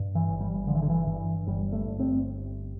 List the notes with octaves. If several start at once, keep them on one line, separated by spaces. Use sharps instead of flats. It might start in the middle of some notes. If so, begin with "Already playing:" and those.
Already playing: G2
E3
G1
G3
D3 F3
E3
D3
E3
G2 E3
G1 G3
A3
G1
C4